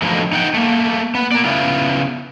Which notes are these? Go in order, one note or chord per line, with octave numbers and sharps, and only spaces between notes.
B2 D3 F3 A3 A#3 D#4
D#4 F#5 G5
A3 A#3
B3
A#3 D5
C#3 B3 E4 F4